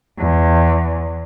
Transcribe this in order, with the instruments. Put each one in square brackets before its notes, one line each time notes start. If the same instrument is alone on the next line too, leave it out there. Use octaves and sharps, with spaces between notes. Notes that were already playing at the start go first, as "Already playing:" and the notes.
[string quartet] E2